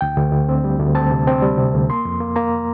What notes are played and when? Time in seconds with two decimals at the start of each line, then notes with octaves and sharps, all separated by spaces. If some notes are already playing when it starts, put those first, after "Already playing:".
0.01 D2 G5
0.17 D2
0.33 D2
0.49 C4
0.64 G3
0.79 D2
0.95 C4 A5
1.11 C3
1.27 C4
1.42 G3
1.58 C3
1.74 D2
1.89 A#3 C6
2.05 F2
2.20 A#3
2.36 A#3 A#5